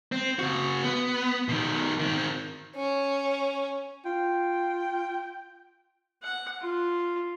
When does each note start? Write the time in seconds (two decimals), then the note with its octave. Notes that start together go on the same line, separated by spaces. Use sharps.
0.12 C4
0.39 C#3 F#4
0.84 B3
1.48 B2 D#3
2.00 D#3 C4
2.76 C#4
4.05 F4 G5
6.22 F#5
6.62 F4